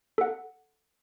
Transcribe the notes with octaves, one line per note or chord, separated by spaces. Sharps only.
A4 F#5